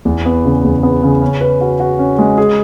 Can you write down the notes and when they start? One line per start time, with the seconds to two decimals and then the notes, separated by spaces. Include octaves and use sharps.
0.05 E2
0.26 B3
0.45 C#3
0.64 E2
0.83 B3
1.03 C#3
1.22 C#4
1.41 B4
1.61 F#4
1.80 F#4
1.99 C#4
2.19 G#3
2.38 G#4